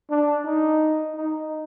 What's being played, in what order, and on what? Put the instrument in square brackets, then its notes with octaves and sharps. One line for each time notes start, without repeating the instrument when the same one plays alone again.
[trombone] D4
D#4
D#4